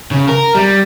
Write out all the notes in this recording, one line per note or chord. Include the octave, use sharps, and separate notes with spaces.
C#3
A#4
G3